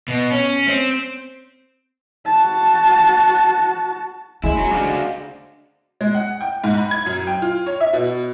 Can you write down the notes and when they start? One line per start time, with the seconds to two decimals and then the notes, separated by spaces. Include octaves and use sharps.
0.08 B2
0.31 C#4
0.68 C4
2.25 F#4 A5
4.44 G#3 C#4 E4 C5
4.59 F#3
4.73 D4 F#4 C5 F5
4.88 F5
6.01 G#3
6.15 F#5
6.41 G5
6.64 G#2
6.78 B5
6.91 G#6
7.06 F#2
7.27 G5
7.42 F4
7.66 C#5
7.81 E5
7.93 B2